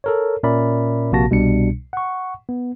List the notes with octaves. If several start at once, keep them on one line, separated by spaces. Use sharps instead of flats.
A4 A#4 C#5
A#2 C#4 A#4 D5 E5 B5
A#1 C3 A#3 F#4 A5 A#6
C2 B2 G3 D4 C#7
F#5 C#6
B3